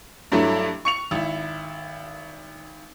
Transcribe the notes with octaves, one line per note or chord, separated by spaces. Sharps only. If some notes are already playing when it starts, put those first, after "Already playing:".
G2 F#3 A3 E4
C#6 C#7 F7
G#1 E4